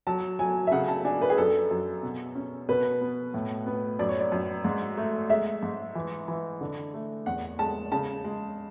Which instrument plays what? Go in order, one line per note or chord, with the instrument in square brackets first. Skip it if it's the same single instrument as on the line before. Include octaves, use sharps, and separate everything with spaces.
[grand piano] F#3 [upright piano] A5
[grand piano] F#3 [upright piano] G#5
[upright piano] E5
[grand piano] C#3 [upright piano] F#5
[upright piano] A5
[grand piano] D4 [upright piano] G#5
[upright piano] B4
G#4
[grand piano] F#2 [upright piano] A4
[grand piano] F#2
B2
C#4
[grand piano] B2 [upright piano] B4
[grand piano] B3
A2
B3
[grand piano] F#2 [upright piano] D5
[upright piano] C#5
D5
[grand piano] F#2
G#2
A3
[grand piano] G#3 [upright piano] E5
[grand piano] G#2
E3
E3
D3
A3
[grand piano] E2 [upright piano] F#5
[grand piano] G#3 [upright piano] A5
[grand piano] C#3 [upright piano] A5
[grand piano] G#3